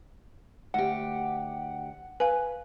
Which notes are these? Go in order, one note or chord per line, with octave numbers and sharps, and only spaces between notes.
D2 G4 F#5
B4 F5 G#5